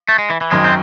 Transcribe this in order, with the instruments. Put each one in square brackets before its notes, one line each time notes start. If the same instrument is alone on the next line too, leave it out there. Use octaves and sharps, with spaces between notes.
[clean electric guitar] A3
G#3
E3
E3
[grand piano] G#1 F#2 D#3 [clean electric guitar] G#3
[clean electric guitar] C4